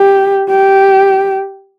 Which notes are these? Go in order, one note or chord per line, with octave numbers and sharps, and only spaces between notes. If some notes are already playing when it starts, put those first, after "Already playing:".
Already playing: G4
G4